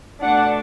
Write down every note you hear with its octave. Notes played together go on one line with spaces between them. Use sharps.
B2 A3 D4 F#5